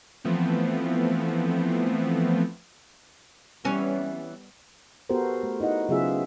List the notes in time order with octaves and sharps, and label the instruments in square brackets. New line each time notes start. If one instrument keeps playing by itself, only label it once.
[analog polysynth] E3 F3 A3 B3 C4
[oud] E3 C#4 [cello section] G3 B3
[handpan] B3 F#4 G4 A4 A#4 C5
A3
D#4 E4 F#4 D#5 F#5
C#3 F#3 B3 F4 G#4 E5